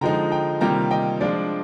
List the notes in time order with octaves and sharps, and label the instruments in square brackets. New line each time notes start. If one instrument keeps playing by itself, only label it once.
[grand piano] D3 F3 G#3 D#4 G5 A#5
G5 A#5
C3 D#3 G3 A#3 F4 G5 A#5
D#5 G5
F3 G#3 D4 F4 D5